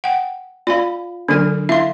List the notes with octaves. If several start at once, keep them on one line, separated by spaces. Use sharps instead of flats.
F#5 G5
F4 D5 F5 G#5 B5
D3 F#3 D4 A4 B4 G#5
E4 E5 F5 C6